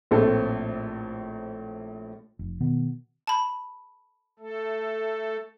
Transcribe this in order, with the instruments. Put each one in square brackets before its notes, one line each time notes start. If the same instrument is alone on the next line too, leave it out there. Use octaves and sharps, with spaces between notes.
[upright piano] A#1 A2 A3 C4 A4
[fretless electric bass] F1
B2 D#3 B3
[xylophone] A5 B5
[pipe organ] A3 A4